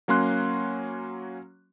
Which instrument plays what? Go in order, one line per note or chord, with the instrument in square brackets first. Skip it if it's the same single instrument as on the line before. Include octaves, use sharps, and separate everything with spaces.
[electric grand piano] F#3 A#3 C#4 C6 F#6